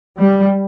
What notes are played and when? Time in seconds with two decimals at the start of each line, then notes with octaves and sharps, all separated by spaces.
0.19 G3